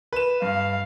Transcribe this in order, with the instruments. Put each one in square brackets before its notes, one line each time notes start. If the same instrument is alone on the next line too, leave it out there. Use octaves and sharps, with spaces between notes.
[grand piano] B4 E7
[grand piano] G2 [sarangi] F5